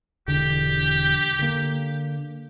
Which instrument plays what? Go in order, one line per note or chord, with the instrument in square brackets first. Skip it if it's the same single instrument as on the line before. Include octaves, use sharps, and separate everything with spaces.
[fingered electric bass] E1 D3 [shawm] G4
[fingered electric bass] D3 A#3